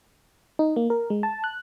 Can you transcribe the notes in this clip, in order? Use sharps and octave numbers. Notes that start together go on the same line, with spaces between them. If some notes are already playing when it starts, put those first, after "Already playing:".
D#4
A#3
A#4
G#3
A5
F#6